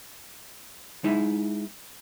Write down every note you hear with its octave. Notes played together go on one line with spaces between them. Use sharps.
G#3 D#4 E4 E5